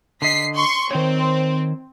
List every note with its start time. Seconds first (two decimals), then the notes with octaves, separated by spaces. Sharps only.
0.22 D3 D#5 B6 C7
0.54 C6 C#6
0.91 D#3 C4 C#5